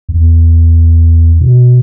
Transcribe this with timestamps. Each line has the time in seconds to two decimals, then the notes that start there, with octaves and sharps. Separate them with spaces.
0.09 E2
1.40 B2